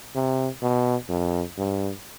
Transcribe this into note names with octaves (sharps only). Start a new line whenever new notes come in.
C3
B2
F2
G2